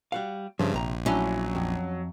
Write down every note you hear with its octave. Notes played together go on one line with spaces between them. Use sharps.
G3 F#4 F5
G2 C#3 F3 E5 C6
A#1 C3 A#5
F#3 C#4 D4 E4 D#5
F2